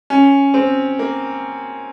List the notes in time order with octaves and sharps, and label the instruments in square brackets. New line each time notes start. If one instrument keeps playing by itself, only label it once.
[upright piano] C#4
C4
A#3